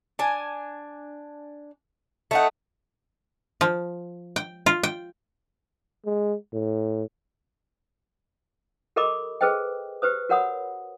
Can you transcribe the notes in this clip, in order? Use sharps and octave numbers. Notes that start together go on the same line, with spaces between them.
D4 G#5
A3 D#4 F#5
F3
G5
F4
G5
G#3
A2
G4 A4 A#4 D#5 B5 D6
G#4 A4 B4 C5 D#5 G5
G4 B4 C5 D#6
F#4 A#4 C#5 F#5 B5 D#6